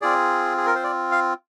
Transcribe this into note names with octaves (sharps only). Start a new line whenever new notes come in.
C4 F4 G#4 D5
G#4
A#4
C5
D5
F5